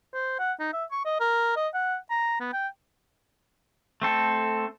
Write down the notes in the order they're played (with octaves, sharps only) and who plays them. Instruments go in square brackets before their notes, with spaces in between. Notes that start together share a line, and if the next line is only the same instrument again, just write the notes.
[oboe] C5
F#5
D#4
E5
C#6
D#5
A#4
D#5
F#5
A#5
B3
G5
[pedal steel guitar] A3 C4 A4